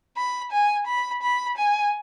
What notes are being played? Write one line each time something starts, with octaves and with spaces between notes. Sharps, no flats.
B5
G#5
B5
B5
G#5